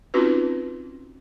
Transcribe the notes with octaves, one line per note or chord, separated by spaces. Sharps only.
C4 C#4 D#4 F4 F#4 B4